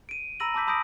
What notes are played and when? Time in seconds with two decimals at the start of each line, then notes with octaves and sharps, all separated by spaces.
0.09 D7 D#7
0.40 A#5 B5 E6 A#6 D#7 F#7
0.54 A5 B5 D6 E6 G6 B6
0.67 A5 B5 D#6 G6 A#6 D7